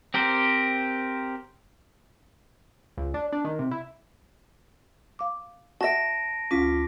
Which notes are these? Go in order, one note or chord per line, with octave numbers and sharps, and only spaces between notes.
C4 G4 A#4 C5
C#2
D4
D4
D#3
C3
E4
F5 D6
F#4 E5 A5 A#6 D7
D2 C#4 F4 D6 B6